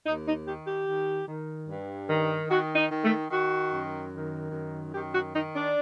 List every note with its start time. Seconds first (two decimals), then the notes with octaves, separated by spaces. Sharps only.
0.05 D#2 D#4
0.26 D#4
0.45 D#3 G4
0.65 G4
0.86 D#3
1.26 D#3
1.67 G2
2.08 D#3
2.48 D#3 F#4
2.75 D#4
2.90 D#3
3.04 A3
3.29 D#3 F#4
3.71 F#2
4.12 D#3
4.51 F#2
4.93 D#3 G4
5.12 F#4
5.33 D#3 D#4
5.54 D4